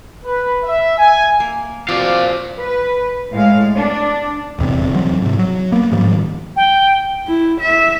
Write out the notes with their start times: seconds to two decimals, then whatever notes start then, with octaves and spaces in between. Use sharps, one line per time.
0.24 B4
0.64 E5
0.98 G#5
1.40 A#3
1.89 C3 F3 F#4 D5 F5
2.59 B4
3.32 A2 G#3 F5
3.75 D4
4.59 D#1 E2 C3
4.94 E2 F#3 C4
5.22 G#2 C3
5.39 F#3
5.72 A#3 B3
5.92 G#2 D#3 F3 G3
6.56 G5
7.28 E4
7.60 E5